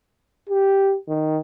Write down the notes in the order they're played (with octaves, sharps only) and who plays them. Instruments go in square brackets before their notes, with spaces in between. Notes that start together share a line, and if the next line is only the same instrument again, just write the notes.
[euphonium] G4
D#3